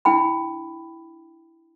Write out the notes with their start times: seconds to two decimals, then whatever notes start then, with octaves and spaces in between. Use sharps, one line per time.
0.05 D4 E4 G5 B5